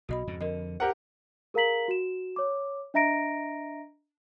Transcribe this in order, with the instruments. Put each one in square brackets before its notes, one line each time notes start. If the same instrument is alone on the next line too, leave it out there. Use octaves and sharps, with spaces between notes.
[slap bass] B1 B2 [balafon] F#4 D#5 B5
[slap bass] F2 G#2 C#3
[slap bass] F2 D3 [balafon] A#4 D#5
[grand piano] G4 A#4 F#5 [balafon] C5
[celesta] G#4 A#4 F5 A#5 B6 F#7
F#4 E7
C#5 D6
D4 D#5 E5 A#5 A#6 D7